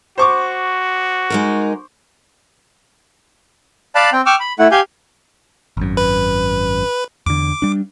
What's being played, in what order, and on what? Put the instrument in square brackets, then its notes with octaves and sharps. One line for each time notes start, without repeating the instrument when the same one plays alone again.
[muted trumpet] F#4 [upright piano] C5 C#6 D6
[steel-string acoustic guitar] G#3 D#4 A#4
[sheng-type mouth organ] D5 F5 A5 B5 F#6
C4 G5
G5 C#6 D6 E6 F6
B5
A3 E4 F#5
G4 F5 G#5 G6
[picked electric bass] G#1 F#2
[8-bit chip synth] B4
[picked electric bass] E2 D3 [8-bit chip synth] D6
[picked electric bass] G3 D4